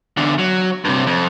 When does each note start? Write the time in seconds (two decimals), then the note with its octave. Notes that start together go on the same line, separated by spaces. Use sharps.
0.17 E2 D3
0.39 F#3
0.85 G2 C3
1.06 F2